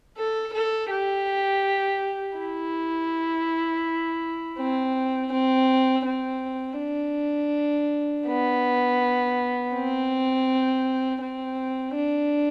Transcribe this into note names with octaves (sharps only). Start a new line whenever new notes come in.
A4
A4
G4
E4
C4
C4
C4
D4
B3
C4
C4
D4